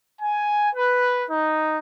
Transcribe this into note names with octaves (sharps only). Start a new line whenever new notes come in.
G#5
B4
D#4